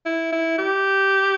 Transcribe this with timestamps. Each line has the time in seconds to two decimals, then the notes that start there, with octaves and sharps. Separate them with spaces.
0.06 E4
0.33 E4
0.58 G4